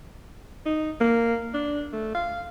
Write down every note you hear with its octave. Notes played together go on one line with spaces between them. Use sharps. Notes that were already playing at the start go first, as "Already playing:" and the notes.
D#4
A#3
D4
A3
F5